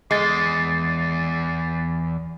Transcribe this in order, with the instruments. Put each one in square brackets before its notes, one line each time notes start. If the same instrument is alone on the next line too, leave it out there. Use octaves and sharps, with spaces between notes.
[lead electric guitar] E2 [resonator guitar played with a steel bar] G#3 [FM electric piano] A6 C7